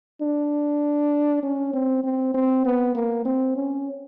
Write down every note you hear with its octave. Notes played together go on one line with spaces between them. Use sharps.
D4
C#4
C4
C4
C4
B3
A#3
C4
C#4